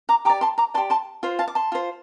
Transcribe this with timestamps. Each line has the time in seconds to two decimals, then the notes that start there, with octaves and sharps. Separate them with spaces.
0.09 A#5 D6
0.25 G4 A#5 D6
0.30 D5
0.41 A5 C6
0.58 A#5 D6
0.74 D5 A5 C6
0.78 G4
0.90 A5 C6
1.23 F4 C5
1.39 F5 A5
1.48 D6
1.55 A5 C6
1.72 F4 C5